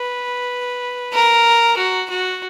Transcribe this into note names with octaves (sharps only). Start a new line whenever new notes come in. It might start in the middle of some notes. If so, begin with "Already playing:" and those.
Already playing: B4
A#4
F#4
F#4